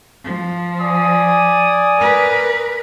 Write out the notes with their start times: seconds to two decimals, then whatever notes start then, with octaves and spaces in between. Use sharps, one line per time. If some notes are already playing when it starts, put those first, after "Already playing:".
0.24 F3
0.80 D5 G#5 D#6
1.98 A#4 B4